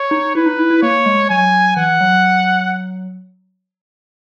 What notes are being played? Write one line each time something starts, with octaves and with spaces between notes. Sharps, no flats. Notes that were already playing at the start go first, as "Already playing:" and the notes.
Already playing: C#5
D#4
E4 B4
D#4
E4
E4
A#3 C#5
G#3
F#3 G#5
E3 F#5
F#3